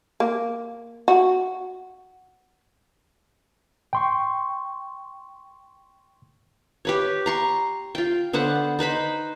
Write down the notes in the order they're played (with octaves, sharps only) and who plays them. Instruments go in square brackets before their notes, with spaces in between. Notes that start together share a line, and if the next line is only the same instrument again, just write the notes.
[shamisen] A#3
F#4
[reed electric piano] G5 C6 C#6
[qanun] G4 B4 C#5
A#5 C6 C#6
F4 G5
D3 B3 C5 F#5
D#4 B4 C5 B5